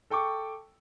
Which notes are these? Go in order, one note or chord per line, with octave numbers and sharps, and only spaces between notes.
A4 G5 C#6 D6